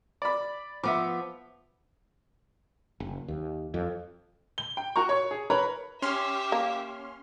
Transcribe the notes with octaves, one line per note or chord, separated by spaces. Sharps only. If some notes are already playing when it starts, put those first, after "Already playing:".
D5 B5
F3 B3 E5 D6
F#1
D#2
F2
G7
G5
F#4 A#4 A#5 C#6
C#5 C#6
G#4
A#4 B4 C#5 A#5 B5
C#4 G4 E5 C6 F6
A#3